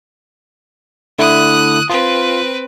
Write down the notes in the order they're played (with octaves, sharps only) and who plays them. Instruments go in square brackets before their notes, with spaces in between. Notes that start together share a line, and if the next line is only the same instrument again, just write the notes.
[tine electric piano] D3 A3 E4 [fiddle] D#6 F#6
[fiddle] C4 B4 [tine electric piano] F4